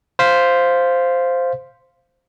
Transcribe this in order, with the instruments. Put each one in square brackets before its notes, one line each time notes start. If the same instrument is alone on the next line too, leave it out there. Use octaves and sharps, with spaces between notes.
[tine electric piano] C5 F5 B6